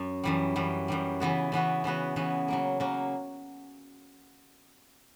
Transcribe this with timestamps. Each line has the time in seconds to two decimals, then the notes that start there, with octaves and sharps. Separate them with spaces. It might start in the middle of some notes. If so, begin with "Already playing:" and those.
Already playing: F#2
0.24 F#2 E3 G3
0.56 F#2 E3 G3
0.88 F#2 E3 G3
1.20 C#3 E3 B3 F#4
1.52 C#3 E3 B3 F#4
1.84 C#3 E3 B3 F#4
2.16 C#3 E3 B3 F#4
2.48 C#3 F#3 A#3
2.80 C#3 F#3 A#3